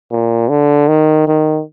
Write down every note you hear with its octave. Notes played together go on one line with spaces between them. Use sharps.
A#2
D3
D#3
D#3